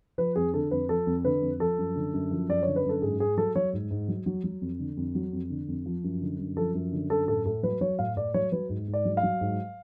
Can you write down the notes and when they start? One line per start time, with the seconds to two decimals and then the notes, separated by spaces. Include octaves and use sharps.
0.18 F3 B4
0.36 F2 G#4
0.54 D3 A4
0.71 F2 B4
0.89 F3 A4
1.07 F2
1.25 D3 B4
1.42 F2
1.60 F3 A4
1.78 F#2
1.95 D3
2.14 F#2
2.31 F3
2.49 F#2 D5
2.63 D3 C#5
2.76 B4
2.84 F#2
2.89 A4
3.02 G#2 G#4
3.19 G#2 G#4
3.37 F#3 A4
3.56 F#3 C#5
3.73 G#2
3.91 G#2
4.08 F#3
4.26 F#3
4.44 F#3
4.62 F2
4.79 D3
4.97 F2
5.15 F#3
5.33 F2
5.50 D3
5.68 F2
5.86 F3
6.04 F#2
6.21 D3
6.39 F#2
6.57 F3 A4
6.74 F#2
6.92 D3
7.10 F#2 A4
7.28 A2 A4
7.46 A2 A4
7.63 F#3 B4
7.81 F#3 C#5
7.99 A2 F5
8.17 A2 D5
8.34 F#3 C#5
8.52 F#3 B4
8.69 G#2
8.88 G#2
8.94 D5
9.05 F#3
9.17 F5
9.23 F#3
9.41 G#2